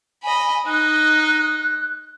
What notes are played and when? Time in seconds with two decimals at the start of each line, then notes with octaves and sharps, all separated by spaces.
0.23 D#5 G#5 B5
0.66 D#4 D#5 F#6